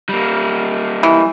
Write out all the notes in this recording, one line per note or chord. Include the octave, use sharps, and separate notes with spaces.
G3 A#3
E3